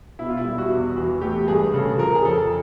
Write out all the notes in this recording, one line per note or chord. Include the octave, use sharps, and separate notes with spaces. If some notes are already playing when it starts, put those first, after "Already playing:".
B2 E4
F4
E4
G3
F#4
E2
E3 F#4
A3 G4
G2 G#4
C#3 A4
F3 A#4
G#4
F2 A4